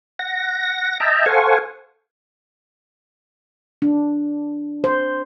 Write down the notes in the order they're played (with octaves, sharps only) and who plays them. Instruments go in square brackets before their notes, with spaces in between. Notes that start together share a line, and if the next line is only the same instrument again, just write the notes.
[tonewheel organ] F#5 A#6
D#5 E5 G5 A5 A#5
A4 C5 F5 F#5 G#5 C#6
[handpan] D4
C5